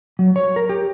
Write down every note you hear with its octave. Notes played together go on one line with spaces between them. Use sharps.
F#3
C#5
A#4
G4